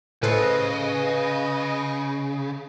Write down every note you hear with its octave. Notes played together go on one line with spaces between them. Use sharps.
A2 C#3 A4 B4 C5 D#5